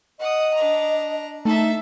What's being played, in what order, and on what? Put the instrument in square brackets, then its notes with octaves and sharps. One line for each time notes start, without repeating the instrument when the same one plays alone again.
[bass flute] D#5 [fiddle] F#5 D#6
[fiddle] D4 A#5
[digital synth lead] A3 [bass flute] D#4 [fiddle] A4 E5